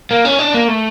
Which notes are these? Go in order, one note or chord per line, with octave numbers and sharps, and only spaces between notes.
A#3
C#4
D4
A#3
A3